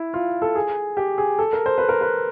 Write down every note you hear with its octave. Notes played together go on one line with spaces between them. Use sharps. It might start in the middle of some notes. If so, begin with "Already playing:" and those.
Already playing: E4
F4
A4
G#4
G4
G#4
A4
A#4
C5
B4
A#4
B4